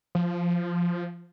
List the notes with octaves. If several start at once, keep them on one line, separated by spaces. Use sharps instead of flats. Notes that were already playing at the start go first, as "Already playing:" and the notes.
F3